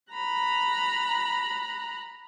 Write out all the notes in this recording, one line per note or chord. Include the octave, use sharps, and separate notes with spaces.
A#5 B5 F#6